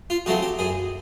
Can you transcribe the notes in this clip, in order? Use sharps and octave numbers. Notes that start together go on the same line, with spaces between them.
F4
C#3 F#3 A3 C4 F#4
G4
F#2 G#4